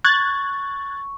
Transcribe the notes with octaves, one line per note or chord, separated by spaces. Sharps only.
C#6 F#6 G#6 A6